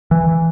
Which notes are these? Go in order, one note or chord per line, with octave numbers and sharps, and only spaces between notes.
E3